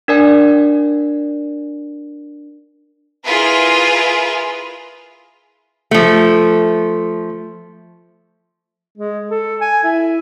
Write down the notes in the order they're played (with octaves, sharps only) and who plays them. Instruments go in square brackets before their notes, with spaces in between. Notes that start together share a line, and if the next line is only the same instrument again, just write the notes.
[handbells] D4 A#4 D5 G#5
[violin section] E4 F4 G#4 A#4 B4
[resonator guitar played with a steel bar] F3 A3
[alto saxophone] G#3
A4
G#5
E4